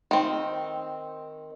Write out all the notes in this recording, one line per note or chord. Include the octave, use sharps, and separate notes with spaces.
D#3 C4